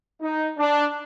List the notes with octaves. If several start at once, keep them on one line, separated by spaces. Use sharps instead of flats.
D#4
D4